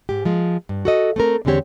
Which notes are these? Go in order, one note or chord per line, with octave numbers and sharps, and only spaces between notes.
G#2 G4
F3 G#3
G2
F#4 A4 D#5
A3 C4 A#4
E2 D3 G#3 C4 G4 C#5